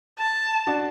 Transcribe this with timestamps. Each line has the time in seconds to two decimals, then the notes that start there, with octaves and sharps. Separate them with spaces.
0.19 A5
0.67 D4 F#4